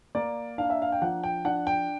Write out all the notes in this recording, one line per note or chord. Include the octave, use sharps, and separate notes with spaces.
A#3 D5
D4 F5
E5
F5
G5
F3 F#5
G5
D4 F#5
G5